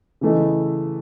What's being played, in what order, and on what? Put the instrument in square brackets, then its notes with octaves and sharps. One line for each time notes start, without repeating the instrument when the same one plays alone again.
[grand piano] C#3 E3 A3 D#4